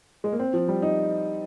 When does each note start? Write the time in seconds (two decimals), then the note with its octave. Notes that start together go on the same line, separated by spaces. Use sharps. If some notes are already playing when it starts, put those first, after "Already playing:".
0.24 G#3
0.33 A#3
0.39 C4
0.53 F3
0.68 G3
0.82 D#4